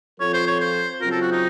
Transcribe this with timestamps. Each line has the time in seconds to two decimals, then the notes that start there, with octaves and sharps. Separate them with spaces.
0.20 F3 C4 F4 A4 C#5
0.34 C5
0.48 C#5
0.60 C5
1.01 C#3 F#3 C4 F4 A#4
1.12 A4
1.22 F#4
1.32 D#4